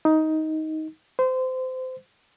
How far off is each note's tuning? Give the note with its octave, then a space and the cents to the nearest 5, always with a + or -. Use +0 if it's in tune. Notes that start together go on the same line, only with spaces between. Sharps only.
D#4 +10
C5 -25